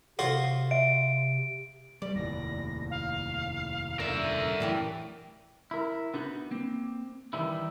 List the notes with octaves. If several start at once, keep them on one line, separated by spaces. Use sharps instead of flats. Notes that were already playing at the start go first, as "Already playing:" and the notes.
C3 F4 F#4 A4 C5
E5 D7
G3 D5
F1 D#2 A2 A#6
F5
D3 A#4 E5 E7
D#7
F#2 A2 E3 G4
E4 A#4
B3 D4 D#4 F#4
A#3 C4
D#3 E3 G3 D#4 E4